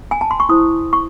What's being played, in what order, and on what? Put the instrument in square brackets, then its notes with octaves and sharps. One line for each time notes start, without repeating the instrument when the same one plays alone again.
[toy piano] G#5
A5
C6
C#6
E4 C5 D#6
C#6